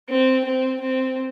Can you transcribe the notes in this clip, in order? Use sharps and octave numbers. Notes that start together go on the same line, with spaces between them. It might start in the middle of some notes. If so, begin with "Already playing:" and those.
C4
C4
C4